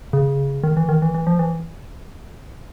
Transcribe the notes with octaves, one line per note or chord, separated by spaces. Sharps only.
C#3
D#3
E3
D#3
E3
E3
F3
E3